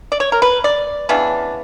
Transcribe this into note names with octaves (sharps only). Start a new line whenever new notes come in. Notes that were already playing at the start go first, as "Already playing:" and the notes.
D5
C#5
A#4
B4
D5
C#3 E3 B3 D4